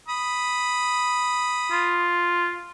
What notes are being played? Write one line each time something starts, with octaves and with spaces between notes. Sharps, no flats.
B5 D#6
F4